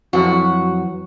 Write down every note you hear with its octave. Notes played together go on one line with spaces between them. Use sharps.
F2 E3 F#3 F#4